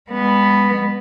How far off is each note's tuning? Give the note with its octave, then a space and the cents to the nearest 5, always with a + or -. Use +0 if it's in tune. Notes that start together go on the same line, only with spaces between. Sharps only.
G#3 -40 B3 +0